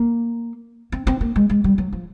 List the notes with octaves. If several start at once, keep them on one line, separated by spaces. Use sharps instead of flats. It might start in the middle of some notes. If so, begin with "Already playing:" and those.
Already playing: A#3
C4
C4
A#3
G#3
G#3
G3
F#3
F3